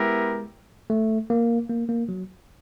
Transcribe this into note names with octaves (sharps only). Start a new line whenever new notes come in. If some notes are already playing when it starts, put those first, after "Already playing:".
Already playing: G#3 B3 E4 G4 A#4
A3
A#3
A#3
A#3
F#3